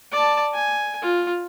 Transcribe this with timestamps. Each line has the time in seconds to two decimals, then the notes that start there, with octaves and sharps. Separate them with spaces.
0.12 D5 A5
0.54 G#5
1.02 F4